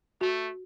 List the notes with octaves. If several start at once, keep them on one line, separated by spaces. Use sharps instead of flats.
A3 F#4